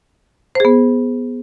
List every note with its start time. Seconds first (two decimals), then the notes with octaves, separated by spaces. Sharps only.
0.55 C5
0.60 G#4
0.65 B3